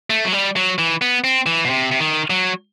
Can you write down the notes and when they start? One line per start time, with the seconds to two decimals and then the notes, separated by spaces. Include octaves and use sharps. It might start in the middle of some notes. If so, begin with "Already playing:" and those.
0.10 A3
0.25 F#3
0.33 G3
0.56 F#3
0.78 E3
1.02 B3
1.24 C4
1.46 E3
1.65 B2
1.69 C3
1.91 C3
2.00 D#3
2.30 F#3